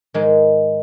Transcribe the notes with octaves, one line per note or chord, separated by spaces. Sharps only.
G#2 D#3 G#3